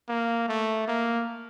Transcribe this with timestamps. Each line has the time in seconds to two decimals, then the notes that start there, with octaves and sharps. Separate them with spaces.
0.09 A#3
0.48 A3
0.88 A#3